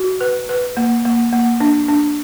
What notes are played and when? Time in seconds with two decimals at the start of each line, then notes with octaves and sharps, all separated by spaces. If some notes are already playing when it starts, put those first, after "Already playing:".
Already playing: F#4
0.21 B4
0.49 B4
0.77 A#3
1.05 A#3
1.32 A#3
1.60 D4
1.88 D4